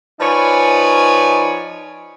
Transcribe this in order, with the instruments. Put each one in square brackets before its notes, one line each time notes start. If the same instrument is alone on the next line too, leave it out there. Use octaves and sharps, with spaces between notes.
[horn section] F3 D#4 B4 C#5 D5 G#5